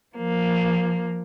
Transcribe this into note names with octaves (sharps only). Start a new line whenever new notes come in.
F3 A#3